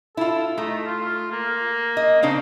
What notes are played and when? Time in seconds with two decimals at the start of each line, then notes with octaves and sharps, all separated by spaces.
0.17 E4 F4 A4
0.58 A3 D#4
0.86 F4
1.32 A#3
1.97 D#5
2.23 C#3 C4 D4 D#4